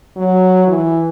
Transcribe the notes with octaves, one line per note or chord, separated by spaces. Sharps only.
F#3
E3